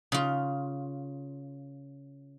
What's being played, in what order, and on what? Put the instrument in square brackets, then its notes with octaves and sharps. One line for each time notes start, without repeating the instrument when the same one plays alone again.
[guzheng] C#3 F4